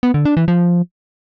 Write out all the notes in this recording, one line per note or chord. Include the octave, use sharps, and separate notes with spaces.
B3
D3
D4
E3
F3